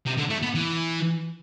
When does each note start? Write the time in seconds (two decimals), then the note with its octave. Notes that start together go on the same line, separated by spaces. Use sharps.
0.06 C3
0.18 D3
0.30 A3
0.43 B3
0.55 E3